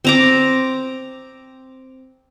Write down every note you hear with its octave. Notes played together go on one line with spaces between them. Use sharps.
C4 A#5 D6